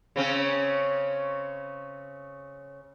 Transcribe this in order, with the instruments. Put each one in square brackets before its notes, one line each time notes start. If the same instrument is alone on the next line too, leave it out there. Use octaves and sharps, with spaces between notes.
[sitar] C#3 C4 C#4